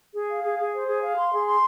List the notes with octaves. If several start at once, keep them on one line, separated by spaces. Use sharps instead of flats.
G#4
F5
G#4
G#4
C5
G#4
F5
C6
G#4
C6